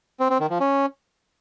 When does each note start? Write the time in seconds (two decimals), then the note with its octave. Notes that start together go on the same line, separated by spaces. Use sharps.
0.20 C4
0.30 C4
0.40 D#3
0.50 F3
0.60 C#4